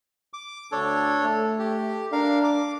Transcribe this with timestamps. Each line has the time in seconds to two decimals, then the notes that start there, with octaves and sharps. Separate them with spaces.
0.33 D6
0.72 D2 D4 A4 C#5
1.23 A3
1.59 G4
2.12 D4 A#4 F5
2.44 D6